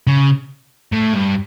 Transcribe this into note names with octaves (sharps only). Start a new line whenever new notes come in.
C#3
A2
G2